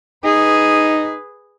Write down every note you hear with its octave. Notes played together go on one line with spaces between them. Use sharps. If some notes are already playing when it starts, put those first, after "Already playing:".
D#4 G#4 B4